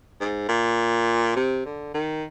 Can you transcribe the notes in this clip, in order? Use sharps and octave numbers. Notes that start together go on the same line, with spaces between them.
G#2
A#2
C3
D3
D#3